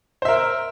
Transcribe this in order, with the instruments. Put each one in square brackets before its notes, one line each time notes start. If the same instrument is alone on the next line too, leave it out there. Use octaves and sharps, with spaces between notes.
[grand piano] C5
E5
A#4